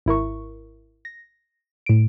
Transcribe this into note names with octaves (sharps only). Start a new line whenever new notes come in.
G#1 E4 A#4 C#6
A#6
A2 D7